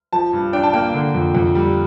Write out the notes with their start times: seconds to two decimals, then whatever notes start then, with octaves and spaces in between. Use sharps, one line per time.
0.13 F3 A5
0.33 G2
0.53 D4 G5
0.63 A5
0.74 A#3 G5
0.94 D3
1.15 F2
1.35 F2
1.55 G3